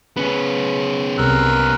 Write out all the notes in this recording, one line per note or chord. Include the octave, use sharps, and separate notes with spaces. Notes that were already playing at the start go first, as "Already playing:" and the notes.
C#3 B3 C#4 B4
C2 C3 A#4 E6 F#6